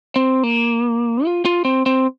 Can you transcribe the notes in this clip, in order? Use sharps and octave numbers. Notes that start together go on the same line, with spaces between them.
C4
A#3
F4
F4
C4
C4